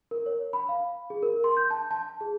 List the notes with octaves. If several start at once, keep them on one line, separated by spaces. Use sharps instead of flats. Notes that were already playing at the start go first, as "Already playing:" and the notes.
A#4
C#5
B5
F5
G#4
A#4
C6
G6
A5
A5
G#4